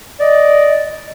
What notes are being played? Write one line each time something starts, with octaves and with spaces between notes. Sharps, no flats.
D5 D#5